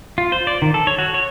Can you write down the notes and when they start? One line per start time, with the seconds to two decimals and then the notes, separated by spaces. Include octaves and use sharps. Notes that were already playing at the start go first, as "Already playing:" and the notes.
0.18 F4
0.32 C5
0.47 D5
0.62 D#3
0.74 A4
0.87 C#5
0.98 F#4
1.14 C#5